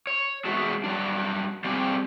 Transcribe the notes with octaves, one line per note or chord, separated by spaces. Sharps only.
C#5
G#3 A3 B3 F#4 G#4
F#3 G3 D4
G3 C4 D4 F4 G4 G#4